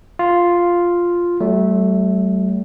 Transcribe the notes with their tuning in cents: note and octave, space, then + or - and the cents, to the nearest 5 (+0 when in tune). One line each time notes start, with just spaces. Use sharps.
F4 +0 F5 +0
F#3 +45 A3 -10